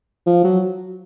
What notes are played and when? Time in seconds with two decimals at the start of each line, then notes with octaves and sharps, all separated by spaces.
0.26 F3
0.44 F#3